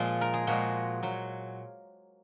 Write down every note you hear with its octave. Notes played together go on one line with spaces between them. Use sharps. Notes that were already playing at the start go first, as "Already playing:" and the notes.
Already playing: A#2 F3 G#3 F4
A#4
G#4
A#2 F3 G#3 F#4
A#2 F#3